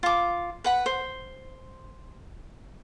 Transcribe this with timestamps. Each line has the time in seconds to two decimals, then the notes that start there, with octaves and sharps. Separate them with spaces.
0.03 F4 D6
0.64 B4 F#5 B5
0.86 C5